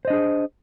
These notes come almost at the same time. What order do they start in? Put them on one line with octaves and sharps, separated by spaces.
C5 D#5 D4 G#4